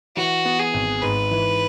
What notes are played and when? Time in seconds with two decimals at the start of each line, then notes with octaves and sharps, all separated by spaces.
0.16 E3 F#4
0.45 B3
0.60 G#4
0.74 G#1
1.03 G#2 B4
1.31 E3